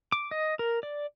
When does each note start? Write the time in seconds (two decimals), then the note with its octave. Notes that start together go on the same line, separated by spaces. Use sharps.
0.12 D6
0.31 D#5
0.59 A#4
0.83 D5